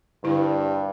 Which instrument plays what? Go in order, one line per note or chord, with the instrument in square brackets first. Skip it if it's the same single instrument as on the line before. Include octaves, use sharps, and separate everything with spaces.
[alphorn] G2 [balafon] D3 E4